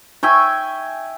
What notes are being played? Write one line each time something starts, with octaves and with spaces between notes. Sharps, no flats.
E5 G5 G#5 C#6